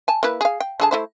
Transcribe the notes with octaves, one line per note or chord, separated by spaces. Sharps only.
G#5 A5
A#3 E4 B4
G#4 F5
G5
D3 G#4 A5
A3 E4 C5